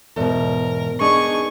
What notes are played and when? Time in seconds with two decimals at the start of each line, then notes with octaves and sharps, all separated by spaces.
0.16 E2 G#2 B2 A#4
1.00 B3 D4 D#4 G#4 C#6